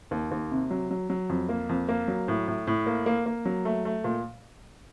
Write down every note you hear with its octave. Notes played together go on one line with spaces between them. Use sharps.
D#2
D#2
C3
F#3
F#3
F#3
F2
A#3
F2
A#3
F#3
A2
A2
A2
A#3
A#3
A#3
F#3
A3
A3
A#2